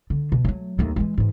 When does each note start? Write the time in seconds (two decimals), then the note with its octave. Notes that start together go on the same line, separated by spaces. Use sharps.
0.10 D3
0.32 B2
0.44 F#3 A3
0.79 D#2 A3
0.96 E3 G#3
1.18 G#2 E3